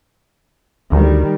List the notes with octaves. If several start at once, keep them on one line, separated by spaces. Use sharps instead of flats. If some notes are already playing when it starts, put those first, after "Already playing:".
D2 D#3 G3